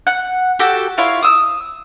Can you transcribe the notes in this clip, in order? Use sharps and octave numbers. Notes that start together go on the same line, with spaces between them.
F#5
F#4 G4 A4
E4 F4 C#5 F5
D#6 E6